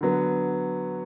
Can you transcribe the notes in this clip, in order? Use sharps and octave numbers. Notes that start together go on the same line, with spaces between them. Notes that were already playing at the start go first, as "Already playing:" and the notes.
D3 F#3 B3